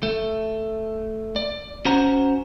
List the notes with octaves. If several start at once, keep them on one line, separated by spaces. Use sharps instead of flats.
A3
D5
C#4 F#4 C5 F#5 A#5